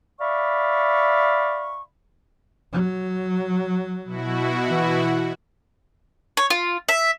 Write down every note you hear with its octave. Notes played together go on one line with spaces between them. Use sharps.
D5 E5 F5 B5 C#6
F#3
B2 E4 F#4
E3
C#5
F4
E5